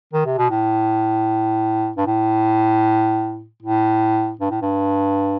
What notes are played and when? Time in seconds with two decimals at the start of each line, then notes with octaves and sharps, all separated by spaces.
0.13 D#3
0.26 C3
0.38 B2
0.50 A2
1.97 G2
2.06 A2
3.62 A2
4.40 G2
4.51 A2
4.62 G2